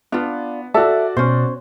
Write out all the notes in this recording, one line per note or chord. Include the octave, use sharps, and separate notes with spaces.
B3 D4 F4
F#4 A4 D5 E5 A5
B2 C#4 C5